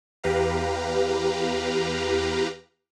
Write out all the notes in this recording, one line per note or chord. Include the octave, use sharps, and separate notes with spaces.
E2 G4 B4 F5 A#5